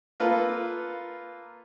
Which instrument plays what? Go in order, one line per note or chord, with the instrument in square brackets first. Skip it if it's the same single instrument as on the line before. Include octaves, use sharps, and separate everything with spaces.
[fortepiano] A#3 F4 A4 B4